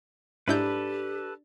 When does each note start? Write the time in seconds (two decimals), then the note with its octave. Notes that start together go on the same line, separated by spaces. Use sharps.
0.48 G#2 D4 E4 G4 A4 B4 G6